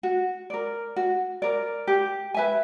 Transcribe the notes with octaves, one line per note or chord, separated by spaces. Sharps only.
F#4
A#4 D5
F#4
A#4 D5
G4
B4 E5 G#5